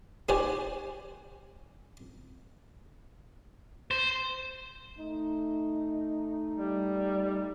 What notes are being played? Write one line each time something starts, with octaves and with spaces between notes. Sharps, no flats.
D#4 F#4 G4 C5 D5 G#5
C5
A3 D#4
G3